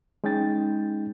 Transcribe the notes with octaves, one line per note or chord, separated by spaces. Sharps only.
G#3 C#4 D#4 G5 A6